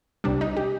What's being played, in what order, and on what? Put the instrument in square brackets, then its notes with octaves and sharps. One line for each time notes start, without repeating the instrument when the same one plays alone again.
[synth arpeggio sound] C2 C3 G3 D4
D#4
G4